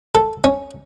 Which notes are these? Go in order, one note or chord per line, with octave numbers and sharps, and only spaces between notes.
A4
C#4